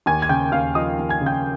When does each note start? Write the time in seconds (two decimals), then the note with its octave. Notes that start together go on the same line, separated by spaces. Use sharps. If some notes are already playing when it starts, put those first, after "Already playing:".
0.06 D#2 G#5 G#6
0.22 G#6
0.29 C#3 G5 G6
0.52 D#2 F5 F6
0.75 F3 D#5 D#6
0.99 D#2
1.09 G#5 G#6
1.21 C#3
1.26 G5 G6